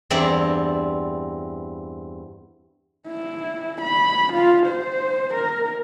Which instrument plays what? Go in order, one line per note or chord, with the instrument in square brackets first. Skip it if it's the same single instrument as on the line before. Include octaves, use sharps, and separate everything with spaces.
[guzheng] E2 G2 C4 E4 D5 A#5
[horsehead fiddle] E4
B5
F4
C5
A#4